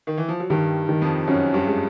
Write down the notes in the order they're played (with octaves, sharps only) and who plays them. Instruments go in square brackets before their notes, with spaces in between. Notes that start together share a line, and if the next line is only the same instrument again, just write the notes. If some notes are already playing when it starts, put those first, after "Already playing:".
[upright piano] D#3
E3
F3
F#3
[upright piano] G2 G3 [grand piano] D#3
[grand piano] D#3
[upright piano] F2 F3
[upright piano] F#2 F#3 [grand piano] C#4
[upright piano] G2 G3
[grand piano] G#3